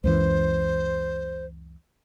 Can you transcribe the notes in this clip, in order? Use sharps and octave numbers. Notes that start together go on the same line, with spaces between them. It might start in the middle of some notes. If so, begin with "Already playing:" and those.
C#2 F#2 E3 C5